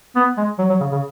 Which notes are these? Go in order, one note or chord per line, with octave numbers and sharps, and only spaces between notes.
B3
G#3
F#3
F#3
C#3
C#3